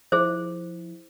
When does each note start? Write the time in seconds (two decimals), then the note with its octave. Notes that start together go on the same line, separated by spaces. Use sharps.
0.12 F3 E4 G#4 C5